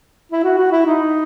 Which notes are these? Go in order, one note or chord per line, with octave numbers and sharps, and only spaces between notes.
E4
F#4
F#4
E4
D#4